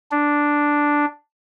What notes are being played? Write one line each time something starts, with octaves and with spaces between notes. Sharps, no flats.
D4